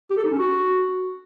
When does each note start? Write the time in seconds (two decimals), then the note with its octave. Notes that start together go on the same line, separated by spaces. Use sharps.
0.10 G4
0.17 A4
0.24 D#4
0.31 C#4
0.38 F#4